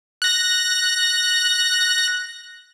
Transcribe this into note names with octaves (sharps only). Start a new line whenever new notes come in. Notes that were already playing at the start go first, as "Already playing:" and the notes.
F#6 A#6